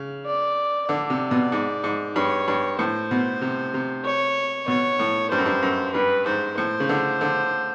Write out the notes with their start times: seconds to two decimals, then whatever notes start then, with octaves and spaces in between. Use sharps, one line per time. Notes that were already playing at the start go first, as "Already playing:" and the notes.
Already playing: C#3
0.26 D5
0.89 D3 D5
1.10 C3
1.31 B2
1.52 G#2
1.84 G#2
2.16 G2 C#5
2.48 G2
2.79 A2 C5
3.11 B2
3.42 C3
3.74 C3
4.05 C#5
4.68 B2 C#5
4.99 A2
5.31 G2 C5
5.38 F#2
5.46 G2
5.62 F#2
5.95 G2 B4
6.26 G#2 C5
6.58 A2 C5
6.80 C#3
6.89 D3
7.21 D3